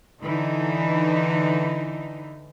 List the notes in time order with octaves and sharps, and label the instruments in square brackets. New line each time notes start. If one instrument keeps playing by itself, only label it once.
[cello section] D3 E3 D#4